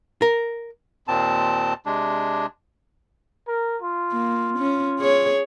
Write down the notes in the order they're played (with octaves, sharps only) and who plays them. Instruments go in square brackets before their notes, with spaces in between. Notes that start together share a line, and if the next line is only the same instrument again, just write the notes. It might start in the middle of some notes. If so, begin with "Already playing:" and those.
[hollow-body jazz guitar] A#4
[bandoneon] D#2 A#2 C4 A5
C3 G#3 D4
[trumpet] A#4
F4
[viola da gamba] A#3
C#4
G#4 C#5